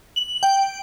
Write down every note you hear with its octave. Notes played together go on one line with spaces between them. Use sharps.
F#7
G5